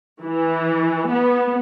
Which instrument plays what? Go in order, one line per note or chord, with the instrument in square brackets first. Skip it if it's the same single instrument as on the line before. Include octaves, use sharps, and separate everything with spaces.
[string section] E3
B3